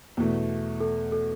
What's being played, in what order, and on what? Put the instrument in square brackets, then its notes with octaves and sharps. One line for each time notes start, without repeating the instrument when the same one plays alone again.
[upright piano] E2 B2 A3
[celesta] A4
A4